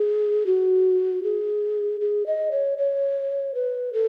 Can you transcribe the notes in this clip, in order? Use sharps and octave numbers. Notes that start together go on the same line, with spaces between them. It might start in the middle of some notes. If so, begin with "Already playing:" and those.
Already playing: G#4
F#4
G#4
G#4
D#5
C#5
C#5
B4
A4